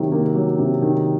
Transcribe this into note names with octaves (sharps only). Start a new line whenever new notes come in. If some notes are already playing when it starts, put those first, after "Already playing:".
Already playing: C3 D#3 F#3
A#3
F#3
C3
D#3